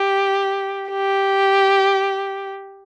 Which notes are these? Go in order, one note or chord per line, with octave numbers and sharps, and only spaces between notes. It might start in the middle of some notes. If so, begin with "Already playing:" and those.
Already playing: G4
G4